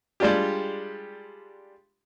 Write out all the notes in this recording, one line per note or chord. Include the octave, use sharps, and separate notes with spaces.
G3 G#3 D4 F4 G4